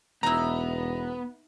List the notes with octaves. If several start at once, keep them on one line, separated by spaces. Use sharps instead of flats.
E1 B3 D#4 E4 A#5